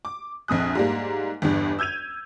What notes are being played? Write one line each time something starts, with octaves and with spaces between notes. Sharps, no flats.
D6
A#1 F2 D#6 F#6
G#2 G3 A#3
G1 E2 G2
E6 G6 G#6 D#7 F7